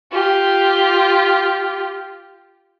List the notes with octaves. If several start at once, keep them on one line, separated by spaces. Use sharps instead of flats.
F4 G4